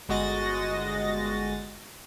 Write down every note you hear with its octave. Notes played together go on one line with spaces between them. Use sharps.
G1 G#3 F#4 D#5 A6 A#6